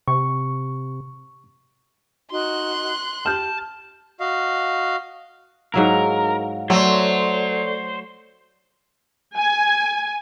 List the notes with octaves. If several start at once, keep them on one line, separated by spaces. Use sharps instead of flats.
C3 C#6
D#4 F#4 C6 F#6
G4 A5 F6 G6
F#4 D#5 F5
G#2 F#3 E4 A#4 F5 F#5
F#3 A3 A4 C5 D5 C6
G#5